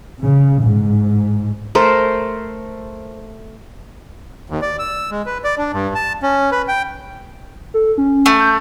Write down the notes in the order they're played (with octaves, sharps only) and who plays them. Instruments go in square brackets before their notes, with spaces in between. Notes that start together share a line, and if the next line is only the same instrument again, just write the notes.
[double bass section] C#3
G#2
[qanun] A3 A#4 C5
[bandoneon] D#2
D5
E6
G#3
B4
D5
D4
G2
A5
C#4
B4
G5
[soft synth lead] A4
C#4
[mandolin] A3
[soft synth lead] G6